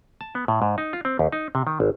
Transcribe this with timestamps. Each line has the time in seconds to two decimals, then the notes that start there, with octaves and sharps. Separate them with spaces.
0.21 A5
0.35 B3
0.48 A2
0.62 G#2
0.78 D#4
0.93 F4
1.05 C4
1.19 D#2
1.32 D#4
1.55 C3
1.67 D#3
1.80 G#1